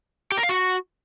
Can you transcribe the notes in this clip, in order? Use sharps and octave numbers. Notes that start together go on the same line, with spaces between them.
G4
A#4
F5
F#4